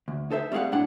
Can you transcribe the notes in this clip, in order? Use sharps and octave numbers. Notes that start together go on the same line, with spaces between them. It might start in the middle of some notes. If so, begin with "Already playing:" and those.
D2
D#4 A4 C5 E5
G3 A3 C4 G#4 F5 F#5
F#2 A2 D4 F#5